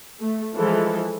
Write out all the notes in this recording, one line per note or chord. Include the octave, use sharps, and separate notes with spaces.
A3
E3 F3 G#3 A4